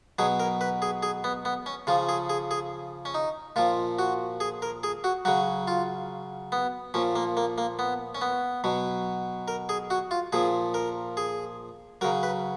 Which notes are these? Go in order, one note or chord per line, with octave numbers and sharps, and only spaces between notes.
B2 F#3 G#4
A#4
B4
G#4
G#4
B3
B3
C#4
C#3 F3 F4
G#4
G#4
G#4
C#4
D#4
A#2 F3 F4
F#4
G#4
A#4
G#4
F#4
C#3 F#3 F#4
F4
B3
A#2 F3 C#4
A#3
A#3
A#3
B3
C#4
B3
B2 F#3
A#4
G#4
F#4
F4
A#2 F3 G#4
A#4
G#4
C#3 F#3 A#4
B4